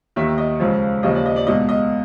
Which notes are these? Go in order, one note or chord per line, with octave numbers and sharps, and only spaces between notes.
D#2 D#3 E5
D#5
C#2 C#3 F3
D#2 C#3 F3 D#5
D5
D#5
D5
C#2 B2 D#5
D#5